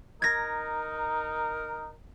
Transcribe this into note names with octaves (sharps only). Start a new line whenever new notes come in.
D#4 A#4 G#6 A#6